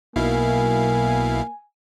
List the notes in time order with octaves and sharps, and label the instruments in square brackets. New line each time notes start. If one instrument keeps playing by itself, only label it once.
[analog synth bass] B1 [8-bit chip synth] B2 E4 F5 [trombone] A#3 [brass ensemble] G#5